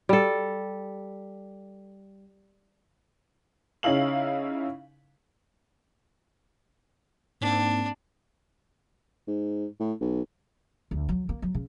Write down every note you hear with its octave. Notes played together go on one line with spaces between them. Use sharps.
G3 A4
C#3 C#4 D#4 E4 F5 F#7
G#2 A#3 C4 D4
G#2
A2
B1
D2
F#3
A#3
F#3
C#3